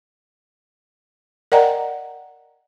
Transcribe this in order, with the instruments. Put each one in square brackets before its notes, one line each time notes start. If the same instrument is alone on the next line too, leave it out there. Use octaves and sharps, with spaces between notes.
[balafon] A#4 D5 D#5 F#5 G5 A#5